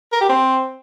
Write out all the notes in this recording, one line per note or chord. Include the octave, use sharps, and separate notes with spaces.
A#4
G4
C4